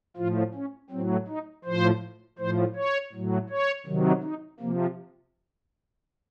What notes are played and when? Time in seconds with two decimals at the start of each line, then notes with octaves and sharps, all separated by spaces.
0.17 A2 F3 F4
0.55 C#4
0.90 A2 F#3 C4
1.28 D#4
1.65 A2 F3 C5
2.39 A2 F3 C5
2.76 C#5
3.13 A2 F#3
3.49 C#5
3.86 C3 D#3 F#3
4.23 D#4
4.60 C3 F3 A#3